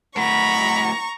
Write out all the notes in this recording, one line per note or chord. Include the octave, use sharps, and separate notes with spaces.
A2 F#4 A#5 B5 C#6